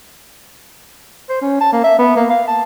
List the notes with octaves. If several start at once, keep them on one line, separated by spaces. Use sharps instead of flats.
C5
C#4
A5
A#3
E5
B3
A#3
F5
A5